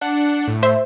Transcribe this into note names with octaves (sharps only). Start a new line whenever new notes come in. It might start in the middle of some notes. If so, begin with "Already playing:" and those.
D4 F#5
A2
C5 E5